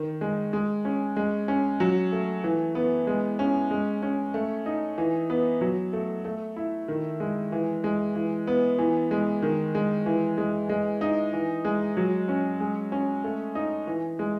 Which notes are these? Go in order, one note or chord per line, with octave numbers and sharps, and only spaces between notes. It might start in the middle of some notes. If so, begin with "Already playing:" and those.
Already playing: D#3
G#3
G#3
C#4
G#3
C#4
F#3
A3
E3
B3
G#3
C#4
G#3
C#4
A3
D#4
E3
B3
F#3
A3
A3
E4
D#3
G#3
E3
G#3
E3
B3
E3
G#3
D#3
G#3
E3
G#3
G#3
D#4
E3
G#3
F#3
C#4
G#3
C#4
A3
D#4
E3
G#3